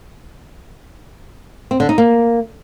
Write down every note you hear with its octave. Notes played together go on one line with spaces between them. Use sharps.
C4
D3
D#4
A#3